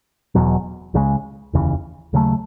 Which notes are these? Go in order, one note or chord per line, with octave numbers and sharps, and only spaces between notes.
E1 E2 B2 F#3
C#2 C#3 F3 G#3
F1 D#2 C#3 E3
D#2 C#3 F#3 A3